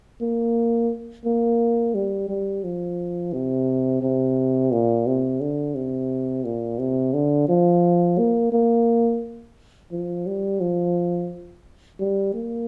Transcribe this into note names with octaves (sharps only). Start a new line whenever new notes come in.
A#3
A#3
G3
G3
F3
C3
C3
A#2
C3
D3
C3
A#2
C3
D3
F3
A#3
A#3
F3
G3
F3
G3
A#3